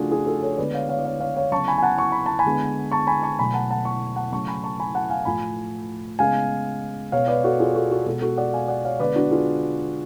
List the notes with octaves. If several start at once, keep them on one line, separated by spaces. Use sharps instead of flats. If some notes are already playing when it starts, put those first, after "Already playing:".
Already playing: C#3 F3 A3 D4 F4 F#4 G#4
F4 G#4
F#4 A4
A4 C#5
D3 G#3 B3 B4 D5
C#5 F5
C#5 F5
D5
C#5 F5
C#5 F5
C#5 F5
C#3 F#3 B3 A5 C#6
G#5 B5
G#5
F#5 A5
C#6
B5
A5
G#5 B5
D3 G#3 B3
A5 C#6
G#5 B5
A5 C#6
B2 F#3 A3 G#5 B5
F#5 A5
F#5 A5
A5 C#6
F#5 A5
C#3 F#3 A3 A5 C#6
G#5 B5
A5 C#6
G#5 B5
F#5 A5
F5 G#5
A2 F3 A3 G#5 B5
C#3 G#3 B3 F5 G#5
B2 G#3 B3 C#5 F5
B4 D5
F#4 A4
F4 G#4
F#4 A4
F#4 A4
B2 G#3 B3 F#4 A4
F#4 A4
D5 F#5
F5 G#5
D5 F#5
C#5 F5
D3 G#3 B3 B4 D5
D4 F#4
F4 G#4